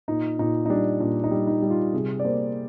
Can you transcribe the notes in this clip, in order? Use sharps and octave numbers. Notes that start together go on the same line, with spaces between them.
A#2 D#4
A#2 D#4
D#4
G3 D4
A#2 D4
D#4
G3
D#4
G3
F4
C3 G#4
D5
A#3 C5